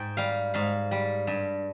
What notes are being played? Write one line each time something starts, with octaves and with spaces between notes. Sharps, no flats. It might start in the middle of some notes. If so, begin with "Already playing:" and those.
Already playing: G#2 G5
G3 F5
G#2 F5
G3
G2